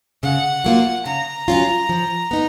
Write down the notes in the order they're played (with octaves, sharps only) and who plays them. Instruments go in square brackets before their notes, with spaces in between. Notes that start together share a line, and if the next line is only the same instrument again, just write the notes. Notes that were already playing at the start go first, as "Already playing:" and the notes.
[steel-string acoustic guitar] C#3 [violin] F#5
[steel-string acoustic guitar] F#3 A#3 F4
[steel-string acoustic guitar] C#3 [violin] A#5
[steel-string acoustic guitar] F#3 C#4 F4
F3
B3 D#4